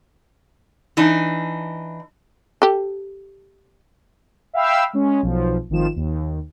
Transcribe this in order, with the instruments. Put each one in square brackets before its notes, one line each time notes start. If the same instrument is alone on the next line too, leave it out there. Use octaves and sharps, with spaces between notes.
[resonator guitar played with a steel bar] E3 D4 D#4
[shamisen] G4 A4
[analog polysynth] E5 F5 G5 B5 E6
G#3 C#4
B1 F3
G#1 D#3 F3 E7
D#2